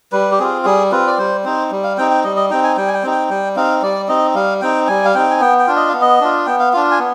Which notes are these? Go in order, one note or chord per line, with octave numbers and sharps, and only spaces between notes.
G3 B4
G4
C4 F4 G#4
G3 G#4
C4 F4 B4
D5
G3 C5
C4 D#4 C5
G3
F5
C4 D#4 G5
G5
G3 D#5
D#5
C4 D#4 G5
G#5
G3 G5
G#5
G5
C4 D#4
G5
G3 G5
C4 D#4 F5
G3 D5
C4 D#4 D#5
G3 F5
C4 D#4 G5
G3 G#5
F5
C4 D#4 G5
G#5
B3 G5
G5
D4 F4
D#5
B3 F5
D#5
D4 F4
B3 G5
F5
D4 F4 F5
G#5
B3